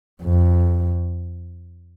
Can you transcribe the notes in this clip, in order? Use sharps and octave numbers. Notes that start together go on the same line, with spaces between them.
F2